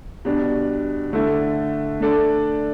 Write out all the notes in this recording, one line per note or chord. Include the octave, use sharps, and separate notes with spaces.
B2 G3 D4
D3 A3 E4
A3 D4 A4 D5